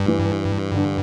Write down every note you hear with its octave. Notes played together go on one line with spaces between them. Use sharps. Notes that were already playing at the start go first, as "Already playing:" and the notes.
Already playing: G2
E3
D3